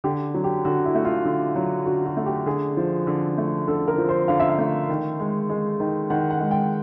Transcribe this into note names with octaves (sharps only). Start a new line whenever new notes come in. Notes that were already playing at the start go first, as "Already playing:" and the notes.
D3 G4
F#3
G4
D3 F#4
E4
A3
F4
D3
F#3
D3 F#4
F#4
A3
G4
D3 G#4
F3
D3
A3
D3 A4
A#4
F3
C5
D3 F5
E5
F5
A3
D#3
G#3
G#3
D#3
D#3 F#5
F#5
G#3
G5